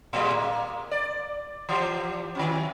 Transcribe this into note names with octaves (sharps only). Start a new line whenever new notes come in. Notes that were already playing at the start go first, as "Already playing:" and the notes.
A2 G3 G#3
A#3
D5
E3 F3 G4
D#3 F#3 C#4